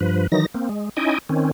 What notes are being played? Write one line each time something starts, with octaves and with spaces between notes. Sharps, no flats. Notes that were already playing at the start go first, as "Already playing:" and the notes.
G2 F3 B4
D#3 E3 F#3 D#4 A#6
A#3 C4
G#3
C#4 D#4 E4 D#5 G5 G#5
D#3 C4 C#4